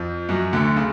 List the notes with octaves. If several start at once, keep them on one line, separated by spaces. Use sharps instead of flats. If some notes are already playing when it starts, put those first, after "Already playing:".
Already playing: F2 F3
F#2 F#3
D2 D3
C#3